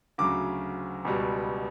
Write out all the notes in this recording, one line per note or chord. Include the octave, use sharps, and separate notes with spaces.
D2 C#3 F#3 D6
C#2 B2 G3